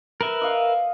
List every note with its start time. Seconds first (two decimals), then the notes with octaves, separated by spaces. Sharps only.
0.21 A#4 B4 E5
0.42 D#5 F5 F#5